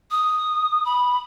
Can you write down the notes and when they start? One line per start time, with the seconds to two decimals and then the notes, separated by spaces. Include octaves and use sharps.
0.11 D#6
0.85 B5